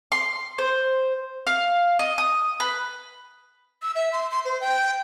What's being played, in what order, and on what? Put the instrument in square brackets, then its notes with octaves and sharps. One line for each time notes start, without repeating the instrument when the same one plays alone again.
[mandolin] C6
C5
F5
D#5
D#6
B4
[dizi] E6
E5
C6
C6
C5
G5